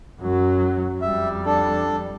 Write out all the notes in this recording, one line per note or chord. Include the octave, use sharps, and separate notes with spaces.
F#2 F#3
F2 G3 E5
D4 A4